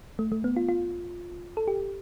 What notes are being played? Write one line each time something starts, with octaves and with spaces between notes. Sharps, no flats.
A3
A3
B3
F4
F4
A4
G4